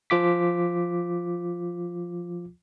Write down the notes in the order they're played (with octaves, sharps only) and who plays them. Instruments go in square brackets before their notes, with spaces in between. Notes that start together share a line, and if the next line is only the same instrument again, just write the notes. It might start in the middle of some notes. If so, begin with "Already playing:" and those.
[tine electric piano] F3 F4 D6 B6